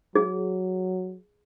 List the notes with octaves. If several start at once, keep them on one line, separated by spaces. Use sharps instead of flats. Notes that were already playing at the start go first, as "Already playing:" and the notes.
F#3 G#4